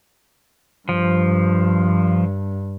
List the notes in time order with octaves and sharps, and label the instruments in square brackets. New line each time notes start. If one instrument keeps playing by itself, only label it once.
[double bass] G2 [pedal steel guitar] F3